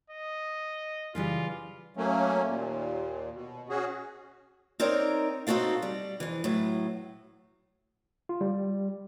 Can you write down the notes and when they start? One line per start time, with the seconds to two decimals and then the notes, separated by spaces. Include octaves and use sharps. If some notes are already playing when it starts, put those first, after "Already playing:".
0.10 D#5
1.15 C#3 E3 G3 F4
1.97 F#3 A3 A#3 C#4
2.45 D#2 A#2
3.33 B2
3.69 C#4 F#4 G#4
4.80 C4 D#4 A#4 C#5 D5
5.47 C4 D#4 F#4 A4 F5
5.82 G3
6.20 F2 E3
6.44 A2 F#3
8.29 F4
8.41 G3